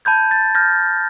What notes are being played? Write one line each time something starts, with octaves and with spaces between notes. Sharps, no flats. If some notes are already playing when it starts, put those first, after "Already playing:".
A5 B5 G6 G#6
A6
F6 G6 A#6